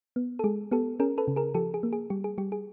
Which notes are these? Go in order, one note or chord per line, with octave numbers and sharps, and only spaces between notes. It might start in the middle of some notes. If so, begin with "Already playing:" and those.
B3
A4
G#3 G#4
B3 G4 A4
C#4 G#4 A#4
A4 B4
C#3
G#4 A#4
F3 G4 A4
G#4
A#3
G#4
G3 G4
G#4
G3 G4
G#4